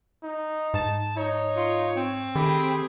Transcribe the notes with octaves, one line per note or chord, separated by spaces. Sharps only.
D#4
G#2 A5
D#4 C#5
F4
C4
D#3 A3 G4 G#4 B5